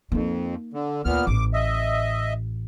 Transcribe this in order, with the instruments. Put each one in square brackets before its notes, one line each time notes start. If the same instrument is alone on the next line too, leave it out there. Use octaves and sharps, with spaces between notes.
[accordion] F2 [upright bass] A#3 D#4
[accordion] D3
[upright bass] D2 [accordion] A#2 B3 F6
[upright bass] A1 A2 [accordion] D6
[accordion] D#5 E5